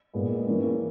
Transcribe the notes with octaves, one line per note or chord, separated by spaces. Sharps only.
A#2 G#3 B3
E3 A#3 C#4